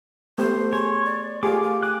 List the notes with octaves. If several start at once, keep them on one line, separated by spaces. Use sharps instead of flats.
A3 B3 G4 C5
G#4 C#5 C6
D5
A3 F4 G4 G#4 D6
F5
G#5 D6 F#6